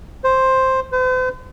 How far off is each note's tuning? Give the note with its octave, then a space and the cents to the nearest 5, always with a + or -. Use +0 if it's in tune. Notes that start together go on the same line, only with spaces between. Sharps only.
C5 +5
C5 -45